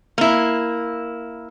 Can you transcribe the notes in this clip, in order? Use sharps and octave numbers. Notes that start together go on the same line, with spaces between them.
A#3 E4